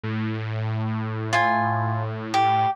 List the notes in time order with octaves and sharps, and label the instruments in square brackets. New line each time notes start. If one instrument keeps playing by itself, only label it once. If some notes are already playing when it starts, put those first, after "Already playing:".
[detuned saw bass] A2
[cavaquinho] F4 G#5
G4